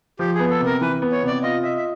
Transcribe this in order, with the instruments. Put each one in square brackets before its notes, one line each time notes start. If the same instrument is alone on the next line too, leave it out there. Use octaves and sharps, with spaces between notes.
[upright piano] F3 [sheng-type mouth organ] G4
[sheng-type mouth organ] G#4
[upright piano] B3
[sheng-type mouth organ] A4
[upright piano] C3
[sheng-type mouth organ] A#4
[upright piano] E3 [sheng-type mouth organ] B4
[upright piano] B3
[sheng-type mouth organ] C#5
[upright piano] C3 [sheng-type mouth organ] D5
[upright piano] F4 [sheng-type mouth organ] D#5
[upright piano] D#5 [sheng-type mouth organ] E5
[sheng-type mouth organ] E5